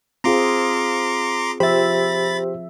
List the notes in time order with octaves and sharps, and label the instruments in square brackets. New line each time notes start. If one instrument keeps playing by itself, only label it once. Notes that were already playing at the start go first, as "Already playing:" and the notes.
[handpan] C4 F4 G#4 [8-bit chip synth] A#5 C6 D6
[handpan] F3 E5 [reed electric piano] G4 C5 [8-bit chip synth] B5 A6